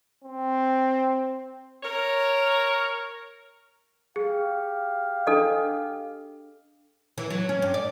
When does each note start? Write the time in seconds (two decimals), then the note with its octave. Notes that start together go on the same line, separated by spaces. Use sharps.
0.24 C4
1.83 A#4 C#5
4.16 G4 G#4 F5
5.27 D4 A4 D#5
7.18 E3
7.30 F#3
7.49 C#4
7.62 G2
7.74 D5